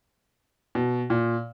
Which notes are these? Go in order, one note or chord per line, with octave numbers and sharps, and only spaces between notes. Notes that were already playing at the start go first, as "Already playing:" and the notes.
B2
A#2